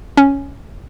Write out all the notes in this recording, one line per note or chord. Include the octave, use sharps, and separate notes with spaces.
C#4